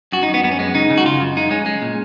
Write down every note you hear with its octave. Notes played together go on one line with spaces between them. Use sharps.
F#2 F#4
D#4
F#2
B3
F#2 B3
C#4
G#3 B3
C#3 D#4
C#3
F#4
F#2 F4
F#2
G#3 D#4
G#3 C#4
G#3
A#2